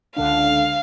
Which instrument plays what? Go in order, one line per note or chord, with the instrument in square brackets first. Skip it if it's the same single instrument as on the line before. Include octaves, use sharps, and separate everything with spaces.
[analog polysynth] C#2 D3 D4 [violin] F5